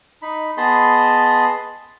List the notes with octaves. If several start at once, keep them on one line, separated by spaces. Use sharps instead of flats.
D#4 B5
B3 G#4 D#5 A5 B5 C6